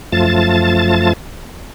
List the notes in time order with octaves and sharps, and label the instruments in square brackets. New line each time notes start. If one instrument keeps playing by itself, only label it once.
[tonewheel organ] F#2 F3 A3 F4 A5 A6